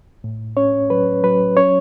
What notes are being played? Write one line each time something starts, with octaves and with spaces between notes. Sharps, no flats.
A2
C#4 C#5
F#3 B4
F#3 B4
C#4 C#5